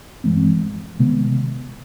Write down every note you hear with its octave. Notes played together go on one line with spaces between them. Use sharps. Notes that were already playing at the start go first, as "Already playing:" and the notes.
G2 E3 G#3 C4
C3 D#3 G#3 B3